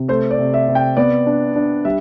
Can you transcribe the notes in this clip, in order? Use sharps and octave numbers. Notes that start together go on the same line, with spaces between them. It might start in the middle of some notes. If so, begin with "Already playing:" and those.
Already playing: C3
A3 C5
D5
C3
E5
C3
G5
B3 D5
D4
D4
G3 E5